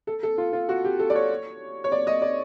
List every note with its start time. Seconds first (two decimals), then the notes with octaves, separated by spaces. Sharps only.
0.07 A4
0.23 A4
0.38 F4
0.53 F4
0.69 F#4
0.84 G4
0.99 A4
1.10 D5
1.15 C#5
1.84 C#5
1.92 D5
2.07 D#5
2.22 D5